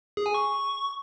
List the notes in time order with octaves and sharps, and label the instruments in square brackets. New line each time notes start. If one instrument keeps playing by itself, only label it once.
[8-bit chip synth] G#4
G#5
C#6